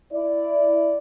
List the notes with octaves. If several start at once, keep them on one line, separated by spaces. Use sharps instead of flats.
E4 D5